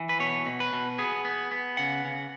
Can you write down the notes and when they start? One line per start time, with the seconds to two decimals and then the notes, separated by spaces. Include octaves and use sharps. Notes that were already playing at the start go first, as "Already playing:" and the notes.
Already playing: E3
0.09 B4
0.20 B2 C#5
0.46 B2
0.60 B4
0.73 B2
0.98 B3 G#4
1.25 B3
1.51 B3
1.77 C#3 F#5
2.05 C#3